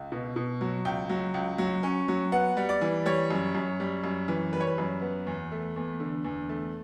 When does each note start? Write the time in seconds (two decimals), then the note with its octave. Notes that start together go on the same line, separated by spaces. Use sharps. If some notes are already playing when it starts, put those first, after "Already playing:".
Already playing: C#2
0.12 B2
0.36 B2
0.61 F#3
0.85 C#2 G5
1.09 F#3
1.34 C#2
1.58 F#3
1.83 C#4
2.08 F#3
2.32 B3 F#5
2.57 G3
2.69 D5
2.81 E3
3.06 G3 C#5
3.30 F#2
3.55 F#2
3.80 G3
4.04 F#2
4.28 E3
4.53 G3 B4
4.60 C#5
4.67 B4
4.78 F#2
5.02 B3
5.27 E2
5.52 A3
5.76 E2
6.00 D3
6.25 E2
6.49 A3